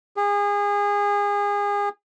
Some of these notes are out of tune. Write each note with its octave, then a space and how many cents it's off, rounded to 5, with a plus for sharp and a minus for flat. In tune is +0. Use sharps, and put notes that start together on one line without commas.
G#4 -30